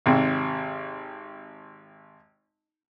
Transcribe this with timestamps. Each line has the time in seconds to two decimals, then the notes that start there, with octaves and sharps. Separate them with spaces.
0.06 G#1 C3